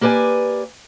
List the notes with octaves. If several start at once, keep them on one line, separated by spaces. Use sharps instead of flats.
A#3 G4 B4 D5 G#5